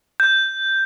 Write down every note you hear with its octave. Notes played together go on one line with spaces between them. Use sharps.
G6